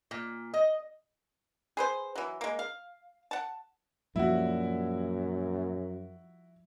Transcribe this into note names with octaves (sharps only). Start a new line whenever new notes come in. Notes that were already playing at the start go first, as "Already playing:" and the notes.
A#2
D#5
G#4 B4 C5
E3 F#3
G#3 A#3
F5
F#5 A5
F#2 A#2 F3 G3 E4 F#4